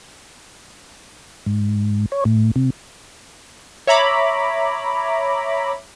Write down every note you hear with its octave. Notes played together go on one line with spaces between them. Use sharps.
G#2
C#5
A2
C3
C#5 E5 A#5 B5 D6